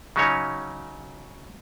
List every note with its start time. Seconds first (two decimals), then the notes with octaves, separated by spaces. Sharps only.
0.16 C#3 F#3 C#4 D#4 C#5